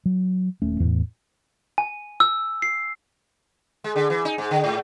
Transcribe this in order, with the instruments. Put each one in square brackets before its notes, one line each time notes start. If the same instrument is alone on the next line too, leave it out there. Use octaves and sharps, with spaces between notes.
[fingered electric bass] F#3
D#1 A3 C#4
E2 A2
[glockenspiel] G#5
E6
C7
[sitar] G#3
D3
E3
D#4
G#2
D3
G#2